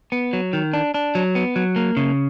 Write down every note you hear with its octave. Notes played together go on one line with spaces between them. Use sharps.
B3
F#3
D#3
D4
D4
F#3
B3
F#3
A#3
C#3